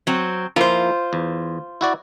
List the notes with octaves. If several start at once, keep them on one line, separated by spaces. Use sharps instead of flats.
F#3 C4
F3 A#3 E4 F4 C5
E2
E4 F#4 D5